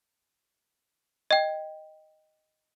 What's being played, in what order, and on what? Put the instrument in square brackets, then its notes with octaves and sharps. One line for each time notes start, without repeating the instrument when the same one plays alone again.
[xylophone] D#5 G5